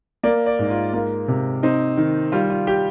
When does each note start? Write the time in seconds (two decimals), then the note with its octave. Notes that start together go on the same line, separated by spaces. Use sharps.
0.23 A#3 D5
0.46 D5
0.59 G#2
0.70 F4
0.93 A#3
1.28 C3
1.63 C4 D#4
1.97 D#3
2.32 G3 F4
2.50 F4
2.67 G4